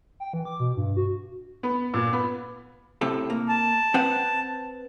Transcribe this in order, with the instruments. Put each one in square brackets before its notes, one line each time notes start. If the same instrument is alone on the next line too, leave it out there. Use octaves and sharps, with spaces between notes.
[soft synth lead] G5
E3
D6
B2
G2
F#4
[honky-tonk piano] B3
A#2
B3
[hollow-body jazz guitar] A2 C3 A4
A#3
[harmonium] A5
[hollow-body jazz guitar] C4 B4 F#5